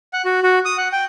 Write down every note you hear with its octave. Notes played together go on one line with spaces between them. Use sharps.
F#5
F#4
F#4
D#6
F#5
G5